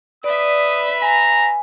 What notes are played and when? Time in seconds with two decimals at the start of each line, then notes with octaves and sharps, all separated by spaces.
0.24 B4 D5 E5 D#6
1.02 G#5 A#5